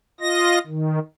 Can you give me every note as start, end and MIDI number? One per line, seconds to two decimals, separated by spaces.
0.20 0.59 65
0.20 0.59 75
0.20 0.59 94
0.67 0.99 51